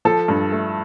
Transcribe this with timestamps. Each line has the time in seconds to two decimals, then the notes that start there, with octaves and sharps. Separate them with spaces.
0.05 F3 A4
0.28 G2
0.52 A3